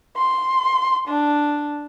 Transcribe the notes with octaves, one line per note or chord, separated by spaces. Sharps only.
C6
D4